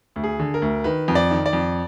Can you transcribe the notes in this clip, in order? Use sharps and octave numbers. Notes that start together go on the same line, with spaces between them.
D2
G#4
D3
A#4
D2
D#3 B4
F2
D5
D#3
D5
F2